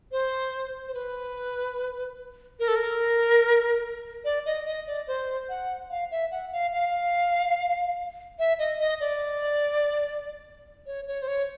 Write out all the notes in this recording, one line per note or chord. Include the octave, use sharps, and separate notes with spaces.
C5
C5
B4
A#4
A4
A#4
D5
D#5
D#5
D5
C5
F#5
F5
E5
F#5
F5
F5
E5
D#5
D#5
D5
C#5
C#5
C5
C#5